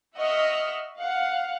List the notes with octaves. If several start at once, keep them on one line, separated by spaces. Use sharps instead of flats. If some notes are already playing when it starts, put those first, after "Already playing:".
D#5 E5 F#5 C#6 E6 F6
F5 F#5